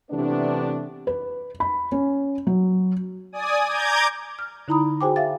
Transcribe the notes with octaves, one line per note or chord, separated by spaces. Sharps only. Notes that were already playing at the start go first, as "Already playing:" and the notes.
C3 E3 A3 B3 D4
B4
B5
C#4
F#3
D5 G#5 D#6
A#5 D6 G6 G#6
F6
D3 D#4 E4 A#5 B5 D#6
F#4 G#4 C5 G5 G#5 D6
E5 F5 A6